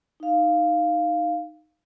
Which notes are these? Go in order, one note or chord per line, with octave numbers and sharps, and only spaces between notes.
D#4 F5